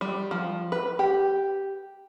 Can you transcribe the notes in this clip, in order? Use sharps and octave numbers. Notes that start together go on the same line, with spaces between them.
G3
F3
B4
G4